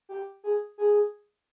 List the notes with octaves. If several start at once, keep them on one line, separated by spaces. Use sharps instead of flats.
G4
G#4
G#4